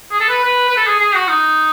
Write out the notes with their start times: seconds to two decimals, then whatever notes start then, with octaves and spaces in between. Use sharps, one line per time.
0.12 G#4
0.20 A4
0.29 B4
0.44 B4
0.69 B4
0.77 A4
0.87 G#4
1.00 G#4
1.15 F#4
1.29 D#4